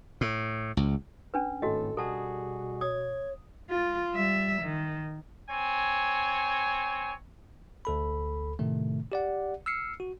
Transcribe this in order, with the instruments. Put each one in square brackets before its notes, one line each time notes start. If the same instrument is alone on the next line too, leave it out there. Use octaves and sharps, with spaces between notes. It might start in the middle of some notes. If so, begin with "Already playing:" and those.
[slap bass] A2
C#2
[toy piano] C#4 D4 B4
[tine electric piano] G#1 A2 [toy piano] F#4 D#5 [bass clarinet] A4
[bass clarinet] B2 [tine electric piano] G3 F#4 G#4 [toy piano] A4 A5
[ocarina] C#5 [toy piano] D#6 [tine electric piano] G#6
[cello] F4
G3 E5
D#3
[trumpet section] C4 C#5 G#5
[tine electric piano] D2 A4 B5
A2 C3 D#3 A3
G4 D5 F#5
E6 F6 C7 C#7
F#4